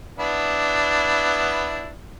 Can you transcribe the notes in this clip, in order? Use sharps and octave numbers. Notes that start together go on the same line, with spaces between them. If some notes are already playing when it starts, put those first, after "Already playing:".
B3 D4 E4